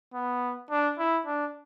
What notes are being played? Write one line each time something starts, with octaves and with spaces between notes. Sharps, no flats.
B3
D4
E4
D4